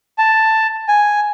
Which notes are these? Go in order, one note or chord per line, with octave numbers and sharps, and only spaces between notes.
A5
G#5